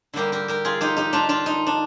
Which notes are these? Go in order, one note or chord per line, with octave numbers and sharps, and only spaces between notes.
D3 G3 A#3 G4 A#4
G4 A#4
G4 A#4
F4 G#4
D#4 G4
D#4 G4
D4 F4
D4 F4
D#4
D4